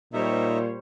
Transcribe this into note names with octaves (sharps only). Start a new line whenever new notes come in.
A#2 G3 D#4 C5 C#5 E5